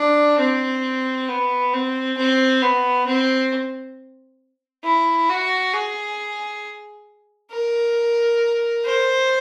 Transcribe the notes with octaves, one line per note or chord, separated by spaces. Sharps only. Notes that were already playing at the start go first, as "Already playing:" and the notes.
Already playing: D4
C4
B3
C4
C4
B3
C4
E4
F#4
G#4
A#4
C5